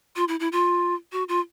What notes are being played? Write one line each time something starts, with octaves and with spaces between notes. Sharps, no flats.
F4
E4
E4
F4
F#4
F4